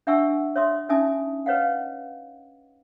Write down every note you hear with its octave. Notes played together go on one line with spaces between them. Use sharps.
D4 E5 F#5 G#5 C#6 E6
C#5 E5 C6 D#6
C#4 D#4 E5 G#5 A5 D#6
B4 C#5 D#5 F5 F#5